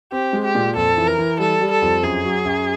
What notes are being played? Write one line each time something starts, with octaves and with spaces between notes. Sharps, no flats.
C4 G4
G#3
G4
A#2
F2 A4
E3
A#4
E3
G3 A4
G3
A4
F2
F#2 G#4
F#3
F#2